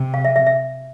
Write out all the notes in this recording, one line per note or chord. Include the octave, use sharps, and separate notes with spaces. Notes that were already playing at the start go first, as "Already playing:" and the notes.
Already playing: C3
F5
E5
E5
E5